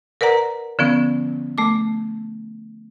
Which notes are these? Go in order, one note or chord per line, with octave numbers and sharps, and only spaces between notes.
A#4 B4 D5 F#5 A#5
D3 F3 B3 C#4
A3 D6